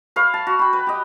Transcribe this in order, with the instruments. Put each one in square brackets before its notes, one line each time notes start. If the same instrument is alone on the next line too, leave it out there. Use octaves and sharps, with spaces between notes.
[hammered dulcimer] B4 C#5 F5
A5
F#4
G5 B5
B4
G4 D#5